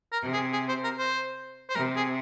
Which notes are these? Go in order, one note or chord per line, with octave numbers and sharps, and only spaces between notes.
A#4
C3
G#4
G#4
C5
A#4
C5
C5
C3 A#4
G#4